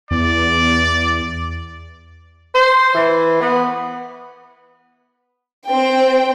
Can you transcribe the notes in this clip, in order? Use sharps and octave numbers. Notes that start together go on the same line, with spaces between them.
E2 D5
C5
E3
B3
C4 G5